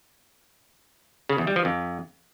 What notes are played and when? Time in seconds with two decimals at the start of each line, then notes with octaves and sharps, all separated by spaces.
1.29 C#3
1.38 E2
1.47 G3
1.56 F3
1.65 F2